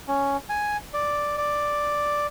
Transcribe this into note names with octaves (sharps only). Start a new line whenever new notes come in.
C#4
G#5
D5
D5